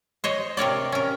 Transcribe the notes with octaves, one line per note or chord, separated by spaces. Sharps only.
C5 C#5 D#5
C3 A#4 C#5 D5
C#4 A#4